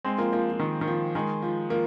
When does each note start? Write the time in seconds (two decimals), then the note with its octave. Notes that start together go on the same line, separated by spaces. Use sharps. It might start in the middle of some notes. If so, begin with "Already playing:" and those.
0.05 G#3 C4
0.18 F3 A#3
0.33 F3 A#3
0.51 F3
0.60 D#3
0.81 D#3
0.88 F3
1.15 D#3 G#3
1.42 F3
1.70 F3 A#3